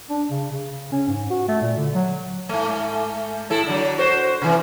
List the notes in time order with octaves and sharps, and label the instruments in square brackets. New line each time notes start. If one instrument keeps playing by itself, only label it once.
[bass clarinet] D4
C#3
C#3
C#4
G#2
F#4
A3
A#2
D3
F#3
[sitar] G#2 A3
A2 E4 A4
D3 F#3
F#4 C5
C3 E3